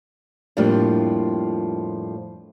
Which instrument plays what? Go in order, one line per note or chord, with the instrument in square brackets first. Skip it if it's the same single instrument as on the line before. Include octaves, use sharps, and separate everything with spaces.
[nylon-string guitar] F2 A2 F3 G3 A#3 D4